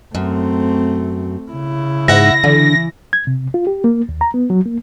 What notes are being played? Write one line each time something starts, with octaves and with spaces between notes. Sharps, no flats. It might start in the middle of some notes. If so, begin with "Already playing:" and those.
F#2 A3 C4
C#3 E4
G#2 E5 F#5 A#6
D3 E3
G#6
C3
F4
G4
A#3
D#2
A#5
B3
F#3
A#3